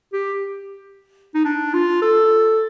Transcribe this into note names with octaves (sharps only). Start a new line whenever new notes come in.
G4
D#4
D4
F4
A4